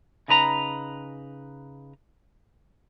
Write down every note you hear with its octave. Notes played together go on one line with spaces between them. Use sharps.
C#3 D#4 B4 A#5